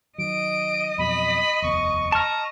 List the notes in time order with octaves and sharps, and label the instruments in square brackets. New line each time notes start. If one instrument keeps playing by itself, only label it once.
[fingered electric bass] D#3 F#3 [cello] D#5 [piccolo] D7
[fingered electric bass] F2 B2 F#3 [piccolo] B5
[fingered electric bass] F1 D#2 B3 [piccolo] C#6
[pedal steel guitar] A5 C#6 F6 [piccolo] A#5